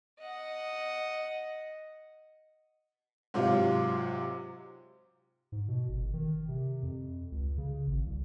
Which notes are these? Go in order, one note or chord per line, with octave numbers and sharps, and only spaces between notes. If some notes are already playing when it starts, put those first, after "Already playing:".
D#5 F#5
G#2 C3 F#3 F4
G#2
B2
G1
D#3
C3
F2
C#2
C#3
G#1
C2